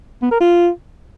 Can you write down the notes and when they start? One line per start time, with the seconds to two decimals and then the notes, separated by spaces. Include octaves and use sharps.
0.22 B3
0.32 A#4
0.41 F4